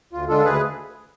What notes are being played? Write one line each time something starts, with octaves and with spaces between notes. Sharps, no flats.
D2 F4
D3 G#3 D4 F4 A4
D2 G#4 B4